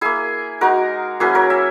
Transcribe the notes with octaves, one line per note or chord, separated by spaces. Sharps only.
A#3 E4 G#4
G#3 D#4 F#4 A#4
F#3 A#3 C#4 E4 G#4 B4
A#4 C#5
E5 G#5